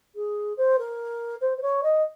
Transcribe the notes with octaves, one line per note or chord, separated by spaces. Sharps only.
G#4
C5
A#4
C5
C5
C#5
D#5